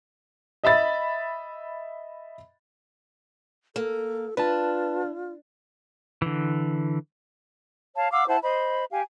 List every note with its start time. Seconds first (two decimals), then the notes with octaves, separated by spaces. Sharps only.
0.64 D#5 E5 B5 A6
3.76 A#3 A4
4.37 D4 F4 B4 A5
6.22 D3 E3
7.95 C#5 F5 A5
8.11 F5 F#5 D6 E6
8.28 E4 C5 F#5 A5
8.42 C5 D#5 B5
8.92 G4 F5 G#5